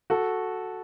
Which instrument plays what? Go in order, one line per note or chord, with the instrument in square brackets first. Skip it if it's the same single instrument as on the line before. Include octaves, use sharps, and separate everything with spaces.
[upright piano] F#4 A4